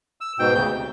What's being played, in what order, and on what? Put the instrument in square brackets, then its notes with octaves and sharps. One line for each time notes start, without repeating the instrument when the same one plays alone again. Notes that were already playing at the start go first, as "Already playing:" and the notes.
[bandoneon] E6
G#2 B2 G5
D2 C#3 G6
C3